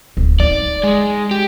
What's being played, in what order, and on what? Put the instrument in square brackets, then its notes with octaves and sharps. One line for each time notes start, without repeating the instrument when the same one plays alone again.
[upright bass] D1
[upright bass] D#4 [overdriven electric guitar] D5
[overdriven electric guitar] G#3
G4